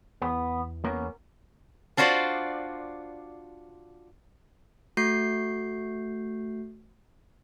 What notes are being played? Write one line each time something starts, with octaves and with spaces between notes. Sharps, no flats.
E2 B3
A#3 B3 C#4
D4 F4 F#4 C5 D5
A3 F#4 G6 C7